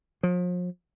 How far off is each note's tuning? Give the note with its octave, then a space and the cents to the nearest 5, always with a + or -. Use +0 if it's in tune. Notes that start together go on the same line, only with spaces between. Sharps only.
F3 +40